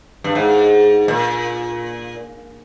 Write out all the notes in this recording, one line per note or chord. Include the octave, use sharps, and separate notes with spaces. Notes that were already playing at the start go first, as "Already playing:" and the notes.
G2
G#2
A#2